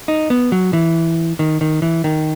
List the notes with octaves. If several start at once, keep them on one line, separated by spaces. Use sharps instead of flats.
D#4
B3
F#3
E3
D#3
D#3
E3
D#3